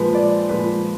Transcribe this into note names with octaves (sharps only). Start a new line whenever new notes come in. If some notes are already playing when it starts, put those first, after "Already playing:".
Already playing: A#2 F3 G#3 B4
D5
A#2 F3 G#3 B4